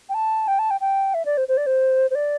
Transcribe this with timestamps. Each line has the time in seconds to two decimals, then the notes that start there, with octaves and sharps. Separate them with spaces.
0.09 G5
0.14 A5
0.48 G5
0.59 A5
0.71 G5
0.81 G5
1.14 E5
1.25 D5
1.37 C5
1.48 C5
1.57 D5
1.66 C5
2.11 C5
2.15 D5